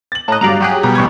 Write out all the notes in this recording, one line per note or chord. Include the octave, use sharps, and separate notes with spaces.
A6 F#7
A2 D#5 A5 A#5 F#6
G2 F#3 G3 D5 F5 A#5
F#3 G4 G#4 G5 F#6
B2 G3 A#5
A1 C#6 G#6